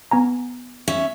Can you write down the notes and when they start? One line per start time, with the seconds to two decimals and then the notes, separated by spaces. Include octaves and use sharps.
0.11 B3 G#5 A#5
0.88 C#4 E5